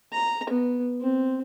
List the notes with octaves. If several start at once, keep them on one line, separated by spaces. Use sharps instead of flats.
A#5
B3
C4